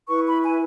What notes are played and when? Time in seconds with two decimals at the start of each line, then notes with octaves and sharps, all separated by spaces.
0.08 E4 B4 C#6
0.25 B5
0.41 G#5